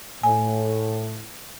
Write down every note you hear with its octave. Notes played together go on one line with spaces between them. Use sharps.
A2 G#5